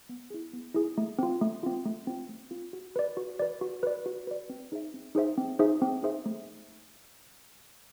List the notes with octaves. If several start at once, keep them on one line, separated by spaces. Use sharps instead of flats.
B3
E4 G#4
B3
E4 G#4
A3
C4 F4
A3
C4 F4
A3
C4 F4
A3
C4 F4
F#4
B4 D5
F#4
B4 D5
F#4
B4 D5
F#4
B4 D5
C4
D#4 G#4 C5 E5
C4
D#4 G#4 C5 E5
C4
D#4 G#4 C5 E5
C4
D#4 G#4 C5 E5
A3